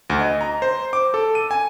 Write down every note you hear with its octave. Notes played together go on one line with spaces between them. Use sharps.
D2
D#5
A#5
C5
D6
A4
D#7
G#5